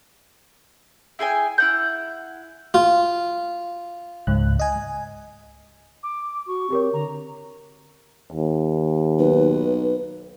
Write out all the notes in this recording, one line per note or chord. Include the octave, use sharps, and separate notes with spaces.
E4 G#4 G5 G#5
E4 F#5 G6
F4
C#2 G#2 F#6
D#5 G#5
D6
F#4 C#6
C4 G4 A#4 C#5
D3 A#5
D#2
B1 B4